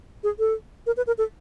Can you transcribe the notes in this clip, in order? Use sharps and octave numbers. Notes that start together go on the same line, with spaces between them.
G#4
A4
A#4
B4
A#4
A4